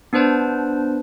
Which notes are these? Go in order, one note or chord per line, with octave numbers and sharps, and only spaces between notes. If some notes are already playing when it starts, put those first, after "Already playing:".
B3 D4 B4 C5 A5